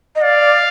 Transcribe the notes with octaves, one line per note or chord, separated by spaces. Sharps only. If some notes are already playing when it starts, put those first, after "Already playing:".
D#5
D5 F5